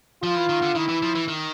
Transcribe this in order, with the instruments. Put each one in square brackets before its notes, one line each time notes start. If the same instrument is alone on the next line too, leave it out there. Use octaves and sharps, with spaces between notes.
[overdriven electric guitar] F3 [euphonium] F4
[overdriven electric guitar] E3
D#3
D3
[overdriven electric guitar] D#3 [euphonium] E4
[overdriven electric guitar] E3
F3
E3
D#3